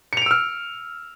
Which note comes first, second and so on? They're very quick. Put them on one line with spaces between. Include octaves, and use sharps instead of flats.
C#7 F7 D7 E6 F6